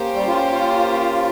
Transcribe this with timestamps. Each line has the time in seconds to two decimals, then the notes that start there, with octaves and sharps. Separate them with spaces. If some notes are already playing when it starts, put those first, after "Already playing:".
Already playing: A#3 C#4 G4 C5
0.15 G3
0.28 F4
0.51 F4